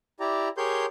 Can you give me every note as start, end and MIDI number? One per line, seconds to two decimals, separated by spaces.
0.20 0.49 64
0.20 0.49 67
0.20 0.49 74
0.20 0.49 82
0.57 0.86 67
0.57 0.86 68
0.57 0.86 70
0.57 0.86 73
0.57 0.86 84
0.57 0.86 91